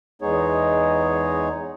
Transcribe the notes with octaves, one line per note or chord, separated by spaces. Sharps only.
E2 G#3 B3 D#4 G#4 C#5